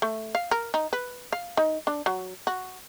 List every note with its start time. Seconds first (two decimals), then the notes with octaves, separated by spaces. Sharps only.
0.02 A3
0.35 F5
0.51 A#4
0.74 D#4
0.93 B4
1.33 F5
1.57 D#4
1.87 D4
2.06 F#3
2.47 F#4